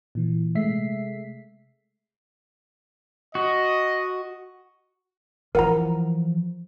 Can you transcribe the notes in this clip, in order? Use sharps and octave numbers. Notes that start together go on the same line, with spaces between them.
A#2 E3
C3 G#3 A3 E5 B6 C7
F#4 D#5
E3 F3 A#4 F#5 A#5